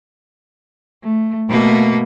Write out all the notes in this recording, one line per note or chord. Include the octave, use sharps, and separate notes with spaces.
A3
B2 A3 A#3